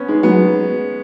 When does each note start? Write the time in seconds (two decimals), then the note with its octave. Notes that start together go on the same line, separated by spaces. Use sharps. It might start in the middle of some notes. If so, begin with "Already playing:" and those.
Already playing: B3 C#4
0.08 G#3 D#4
0.23 F#3 B3